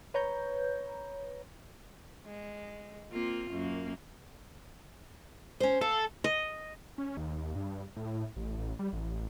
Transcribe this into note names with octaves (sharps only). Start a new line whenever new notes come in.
B4 C#5 A#5 G6
G#3
A#3 C4 F4
F#2 A#3
C#4 C5
A4 F5
D#5
C#4
D#2
G2
A2
A1
A1
G3
A1